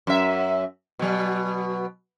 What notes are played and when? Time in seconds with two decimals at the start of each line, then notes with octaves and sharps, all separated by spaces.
0.07 F#2 E5
0.99 B2 F#3